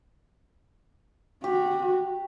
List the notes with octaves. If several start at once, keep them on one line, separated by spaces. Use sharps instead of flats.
F#4 G4